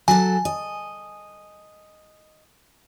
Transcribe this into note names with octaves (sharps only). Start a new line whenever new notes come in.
F#3 A4 G#5
D#5